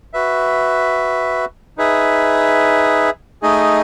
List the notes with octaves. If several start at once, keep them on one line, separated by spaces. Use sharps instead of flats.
F#4 B4 E5
D#4 G#4 B4 E5
A3 D#4 G#4 D#5